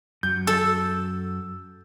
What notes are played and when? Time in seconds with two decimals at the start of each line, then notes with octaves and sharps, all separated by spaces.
0.23 F#2 F#3 G6
0.47 A4 E6